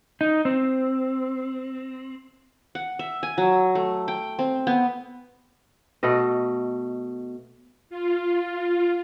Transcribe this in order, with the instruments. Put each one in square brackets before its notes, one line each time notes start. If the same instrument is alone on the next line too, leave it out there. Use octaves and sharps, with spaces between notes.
[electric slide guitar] D#4
C4
[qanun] F#5
E5
G#5
F#3
A3
G5
C4
B3
[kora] B2 A3 D#5
[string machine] F4